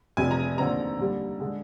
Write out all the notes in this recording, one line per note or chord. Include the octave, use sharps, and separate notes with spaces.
F1 F2 C3 F3 G#5
A#5
D#2 D3 F3 C4 A#5
D#2 D3 G3
D3 G#3